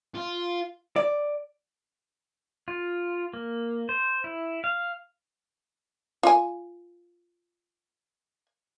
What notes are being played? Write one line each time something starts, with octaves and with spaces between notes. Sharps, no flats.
F4
D5
F4
A#3
C5
E4
F5
F4 G#5